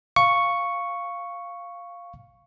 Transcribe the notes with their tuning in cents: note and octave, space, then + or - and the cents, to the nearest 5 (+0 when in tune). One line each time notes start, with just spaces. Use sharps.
F5 +0 C#6 +0